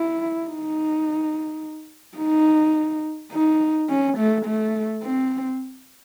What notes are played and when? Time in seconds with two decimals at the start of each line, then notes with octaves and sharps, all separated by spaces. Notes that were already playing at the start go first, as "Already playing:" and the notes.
Already playing: E4
0.47 D#4
2.18 D#4
3.32 D#4
3.89 C#4
4.18 A3
4.46 A3
5.03 C4